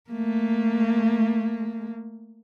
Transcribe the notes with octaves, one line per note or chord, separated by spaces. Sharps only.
A3 A#3